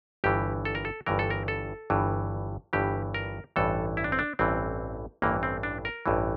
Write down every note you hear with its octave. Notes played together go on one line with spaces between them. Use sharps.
G1 G2 E3 G4
A4
A#4
A4
G1 G2 E3 A#4
A4
A#4
A4
G1 G2 E3
G1 G2 E3 G4
A#4
A1 G2 E3 A4
E4
D4
C4
D4
A1 G2 E3 C4
A1 G2 E3 A#3
C4
D4
A#4
A1 G2 E3